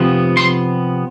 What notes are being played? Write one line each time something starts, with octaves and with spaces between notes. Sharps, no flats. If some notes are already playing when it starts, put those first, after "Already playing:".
Already playing: C3 F3 B3
C6